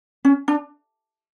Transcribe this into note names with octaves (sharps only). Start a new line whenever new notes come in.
C#4
D4